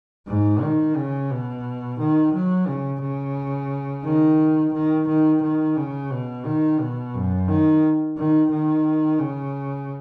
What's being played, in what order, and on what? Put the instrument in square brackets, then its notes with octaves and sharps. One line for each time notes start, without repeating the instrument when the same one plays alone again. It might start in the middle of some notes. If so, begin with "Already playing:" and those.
[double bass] G#2
D#3
C#3
B2
D#3
F#3
C#3
C#3
D#3
D#3
D#3
D#3
C#3
B2
D#3
B2
F#2
D#3
D#3
D#3
C#3